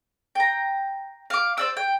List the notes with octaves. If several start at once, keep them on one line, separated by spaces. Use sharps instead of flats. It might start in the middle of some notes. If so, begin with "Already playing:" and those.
G5 A#5
F5 D6
C5 D5 E6
G5